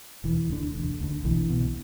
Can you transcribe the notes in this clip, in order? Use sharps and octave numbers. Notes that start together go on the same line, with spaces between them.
E1 E3
D2 D3
E1
D2 D3
B1 E3
B2